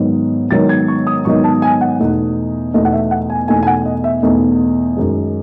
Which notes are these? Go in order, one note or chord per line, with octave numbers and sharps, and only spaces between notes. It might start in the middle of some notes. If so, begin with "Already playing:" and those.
Already playing: G#2 D#3 F#3 B3 D#4
G#2 D#3 F#3 B3 D#4 A6
G#6
C#6
D#6
G#2 D#3 F#3 B3 D#4 C#6
A5
G#5
F#5
E2 B2 A3 D#4
E2 B2 A3 D#4 D#5
F#5
E5
F#5
G#5
E2 B2 A3 D#4 G#5
G#5
F#5
D#5
E5
E2 B2 A3 D#4
F#2 D#3 G#3